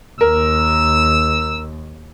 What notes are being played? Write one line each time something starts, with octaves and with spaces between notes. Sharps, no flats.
D#2 A#4 E6